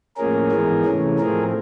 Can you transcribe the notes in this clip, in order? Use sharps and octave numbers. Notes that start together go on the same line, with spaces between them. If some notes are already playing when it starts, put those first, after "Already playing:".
A2 F3 A#3 C#4 G#4 A#4
G#2 E3 G#3 B3
C3 E3 A3 C#4
A2 F3 A3 C4 G#4 A#4